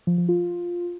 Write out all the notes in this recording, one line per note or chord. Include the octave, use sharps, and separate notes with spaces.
F3
F3
F4